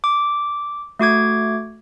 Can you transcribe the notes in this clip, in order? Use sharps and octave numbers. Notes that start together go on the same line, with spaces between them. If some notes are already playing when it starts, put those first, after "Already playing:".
D6
A3 F#4 D6 G#6